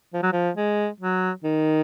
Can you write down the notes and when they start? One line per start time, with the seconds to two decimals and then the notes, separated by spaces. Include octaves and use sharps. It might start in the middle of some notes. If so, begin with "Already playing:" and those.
0.13 F3
0.22 F#3
0.32 F3
0.57 G#3
1.00 F#3
1.44 D#3